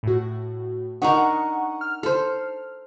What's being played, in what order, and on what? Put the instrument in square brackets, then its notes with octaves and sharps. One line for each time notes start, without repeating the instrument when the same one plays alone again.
[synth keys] A2 F#4
[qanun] D4 D#4 A#4 [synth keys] F#5 C#6 D#6
[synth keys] F6
[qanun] A4 C5